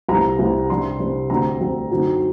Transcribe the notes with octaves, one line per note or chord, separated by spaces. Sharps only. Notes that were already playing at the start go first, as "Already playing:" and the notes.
C2 C3 G3 A#5
C2 C3 G3
C3 G3 D4 C6
C3 G3 D4
D2 D3 G3 C4 A#5
D2 D3 G3 C4
F#2 D3 F#3 C4 D#4